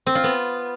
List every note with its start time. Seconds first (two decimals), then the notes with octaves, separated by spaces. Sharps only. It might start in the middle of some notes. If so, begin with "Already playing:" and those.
0.06 C4
0.15 F4
0.24 B3